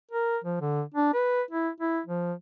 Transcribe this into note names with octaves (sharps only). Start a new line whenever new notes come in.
A#4
F3
D3
D4
B4
E4
E4
F3